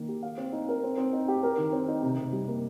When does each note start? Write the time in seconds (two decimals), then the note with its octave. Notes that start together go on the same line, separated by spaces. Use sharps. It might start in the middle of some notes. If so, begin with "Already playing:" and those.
Already playing: D#3 A#3
0.08 G4
0.23 F5
0.38 C4
0.53 D#4
0.69 A#4
0.84 C4
0.98 C4
1.13 D#4
1.28 G4
1.43 A#4
1.58 D#3
1.73 C4
1.88 D#4
2.02 C3
2.18 C3
2.33 G3
2.48 A#3